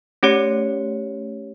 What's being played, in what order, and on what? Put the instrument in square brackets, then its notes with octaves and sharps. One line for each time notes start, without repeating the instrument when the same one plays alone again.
[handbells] A3 C#4 G4 C#5 C#7